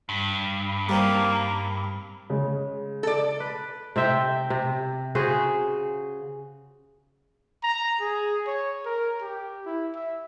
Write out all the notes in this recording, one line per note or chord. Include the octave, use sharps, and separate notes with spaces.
G2
G3 A#3 C4 D#4
C#3 G#3
A4 D5
B4
C3 C4 E5 G5
C3
C#3 F#4 G#4 C5
A#5
G#4
C#5
A#4
G4
E4
E5